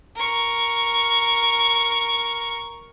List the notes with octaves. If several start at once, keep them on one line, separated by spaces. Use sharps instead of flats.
A#4 C#6